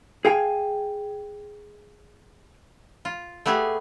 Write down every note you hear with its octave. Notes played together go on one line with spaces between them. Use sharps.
G#4 F5 G5 G#5
F4
A3 B3 G4 G#4 G#5